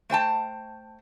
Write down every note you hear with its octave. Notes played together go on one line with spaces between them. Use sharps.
A3 C5 G5 A5